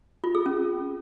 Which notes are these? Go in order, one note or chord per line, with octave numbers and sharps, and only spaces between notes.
F4
G#4
C#4